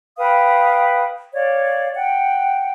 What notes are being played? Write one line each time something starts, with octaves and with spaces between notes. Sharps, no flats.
B4 F5 G5 D#6
C#5 D5 F5
F#5 G5